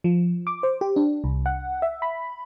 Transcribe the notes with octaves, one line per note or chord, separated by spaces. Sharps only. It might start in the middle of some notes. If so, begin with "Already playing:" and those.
F3
D6
C5
G4
D4
C2
F#5
E5
B5